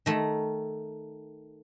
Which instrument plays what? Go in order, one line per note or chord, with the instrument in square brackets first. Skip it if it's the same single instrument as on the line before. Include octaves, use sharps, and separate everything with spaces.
[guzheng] D#3 A3